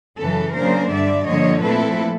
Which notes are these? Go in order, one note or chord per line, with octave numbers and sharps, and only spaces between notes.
F#2 C#3 E3 A4 B4
C#3 F#3 A#3 D4 A#4 C5
G2 D3 G3 D5 E5
G2 D3 F3 A#3 C#5 D#5
A#2 F3 A3 C4 E4 A4 B4